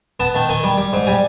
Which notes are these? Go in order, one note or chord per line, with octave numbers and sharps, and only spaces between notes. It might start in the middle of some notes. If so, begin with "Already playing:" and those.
B3 A5
D#3 A5
D#3 G#5
G3
G3
G#2
G3 G#5